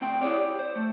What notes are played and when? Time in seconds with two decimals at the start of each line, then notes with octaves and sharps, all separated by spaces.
0.01 D2 C4 G5
0.21 E4 G#4 C#5 D5
0.36 G4
0.59 C5
0.76 A3